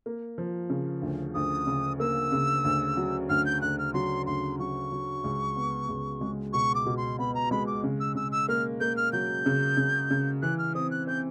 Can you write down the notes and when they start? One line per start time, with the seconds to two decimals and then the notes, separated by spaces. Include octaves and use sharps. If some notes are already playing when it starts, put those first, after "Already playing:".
0.06 A#3
0.38 F3
0.70 C#3
1.02 D2
1.34 D2 D#6
1.67 C#3
2.00 A#3 E6
2.32 C#3
2.65 D2
2.97 F#3
3.29 D2 F6
3.46 G6
3.62 D2 F#6
3.78 F6
3.94 F#3 C6
4.26 D2 C6
4.59 F#3 C#6
4.92 F#3
5.24 C#2
5.56 B3
5.89 C#2
6.21 G#3
6.53 B2 C#6
6.75 D6
6.86 B2
6.97 C6
7.19 B3 B5
7.35 A#5
7.51 G#3 B5
7.67 D6
7.84 C#3
8.00 E6
8.15 C#3 E6
8.32 E6
8.48 A#3 F6
8.81 A#3 G6
8.97 F6
9.13 F#3 G6
9.46 C#3
9.77 C#3
10.11 C#3
10.42 E3 F#6
10.58 F6
10.75 C4 D#6
10.91 F#6
11.07 C4 G6